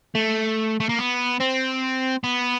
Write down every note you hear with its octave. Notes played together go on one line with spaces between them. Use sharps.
A3
A3
A#3
B3
C4
B3